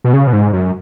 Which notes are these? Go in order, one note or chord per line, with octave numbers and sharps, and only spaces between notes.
B2
C#3
B2
G#2
F#2